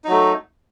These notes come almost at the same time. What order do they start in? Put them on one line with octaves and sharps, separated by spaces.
D#4 F#3 A3